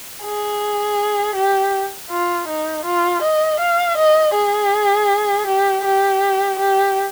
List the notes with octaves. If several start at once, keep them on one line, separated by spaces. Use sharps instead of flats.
G#4
G4
F4
D#4
F4
D#5
F5
D#5
G#4
G4
G4
G4